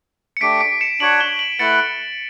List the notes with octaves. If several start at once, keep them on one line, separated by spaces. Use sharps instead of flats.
C#7
A3 D4 G4 B6 D7
B6 D7
C#7 E7
D4 F#4 C#5 F#5 D7 F#7
E7 G7
D7 F#7
A3 E4 B4 F#5 A6 C#7